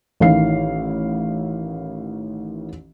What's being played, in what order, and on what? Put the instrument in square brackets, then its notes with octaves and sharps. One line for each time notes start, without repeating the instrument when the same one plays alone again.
[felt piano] A1 D#3 E4 F5 C7